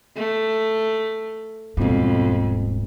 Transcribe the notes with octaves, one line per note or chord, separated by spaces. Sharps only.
A3
D#1 F2 G#2 B2